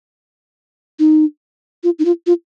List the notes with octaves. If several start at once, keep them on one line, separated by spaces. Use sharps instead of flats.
D#4
F4
D#4
F4
F4